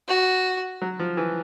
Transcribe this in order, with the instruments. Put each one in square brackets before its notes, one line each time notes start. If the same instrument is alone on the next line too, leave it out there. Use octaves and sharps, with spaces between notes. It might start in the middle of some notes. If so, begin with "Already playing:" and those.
[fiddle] F#4
[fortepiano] F#3
F3
E3